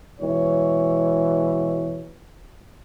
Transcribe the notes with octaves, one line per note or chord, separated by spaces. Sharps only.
B2 E3 G#3 C#5